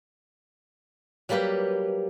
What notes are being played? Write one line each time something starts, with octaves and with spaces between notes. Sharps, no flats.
F#3 G3 A#3 G4 B4